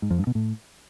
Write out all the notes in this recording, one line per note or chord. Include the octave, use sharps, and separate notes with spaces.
G#2
F2
G2
B2
A2